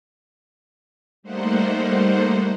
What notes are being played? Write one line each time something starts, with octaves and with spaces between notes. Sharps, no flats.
G3 A3 A#3 D#4 C5 F#5